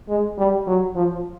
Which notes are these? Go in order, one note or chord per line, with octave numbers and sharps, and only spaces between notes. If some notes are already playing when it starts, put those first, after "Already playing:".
G#3
G3
F#3
F3